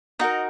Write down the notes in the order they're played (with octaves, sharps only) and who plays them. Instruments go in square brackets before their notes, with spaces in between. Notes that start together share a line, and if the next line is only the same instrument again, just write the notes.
[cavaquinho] D#4 F#4 A#4 D#5